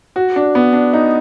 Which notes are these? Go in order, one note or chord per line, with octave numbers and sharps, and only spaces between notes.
F#4
D4
B3
D4
D#4